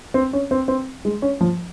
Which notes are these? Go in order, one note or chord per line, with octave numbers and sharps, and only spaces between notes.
C4
C#4
C4
C4
G#3
C#4
F3